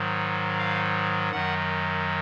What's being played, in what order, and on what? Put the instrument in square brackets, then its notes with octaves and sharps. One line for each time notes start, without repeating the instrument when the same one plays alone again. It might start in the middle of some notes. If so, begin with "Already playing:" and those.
Already playing: [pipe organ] G#2 D#3 F#3
F5
F#2 D#3 F#3 F#5